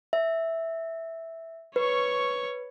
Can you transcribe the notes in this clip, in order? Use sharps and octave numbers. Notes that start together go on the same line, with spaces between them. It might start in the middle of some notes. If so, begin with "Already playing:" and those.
E5
B4 C#5 C#6